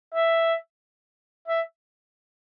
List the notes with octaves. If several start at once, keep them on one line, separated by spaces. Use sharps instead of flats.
E5
E5